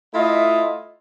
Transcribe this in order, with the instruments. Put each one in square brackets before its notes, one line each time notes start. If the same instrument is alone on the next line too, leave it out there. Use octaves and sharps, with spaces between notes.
[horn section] A3 E4 F4 D#5 E5